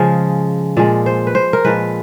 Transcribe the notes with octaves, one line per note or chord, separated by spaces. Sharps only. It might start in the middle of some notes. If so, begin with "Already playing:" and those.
Already playing: C#3 F3 G#3
A#2 F3 G#3 D5
C5
B4
C5
A#4
A#2 F3 G#3 B4